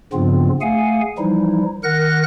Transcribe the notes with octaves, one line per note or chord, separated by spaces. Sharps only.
G2 C#3 F3 B3 C4 F4
A3 G#4 F5 F#5 G#5
E3 F3 G3 D#4 E4
D#3 A#4 F#5 F#6 A#6